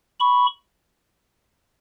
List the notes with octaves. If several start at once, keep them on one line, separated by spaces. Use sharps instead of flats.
B5 C#6